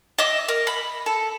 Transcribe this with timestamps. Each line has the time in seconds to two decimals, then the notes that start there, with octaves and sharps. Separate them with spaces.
0.18 D#5 E5 D6
0.48 A#4
0.67 B5
1.06 A4